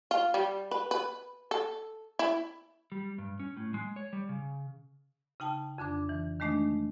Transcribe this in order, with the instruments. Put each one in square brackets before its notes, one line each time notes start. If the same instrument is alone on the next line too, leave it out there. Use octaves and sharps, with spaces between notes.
[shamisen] F4
G3
B4
B4
A4
E4
[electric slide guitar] G3
G2
C#4
A2
G#3
C#5
G3
C#3
[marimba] C#3 D#4 G5 A5
F2 D3 D4 D6
E3
D#3 G#3 A3 D4 D#4